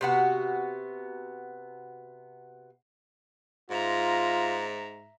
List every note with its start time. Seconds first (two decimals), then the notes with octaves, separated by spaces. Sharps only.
0.01 C3 B3 F#4
3.70 G#2 F4 E5 A#5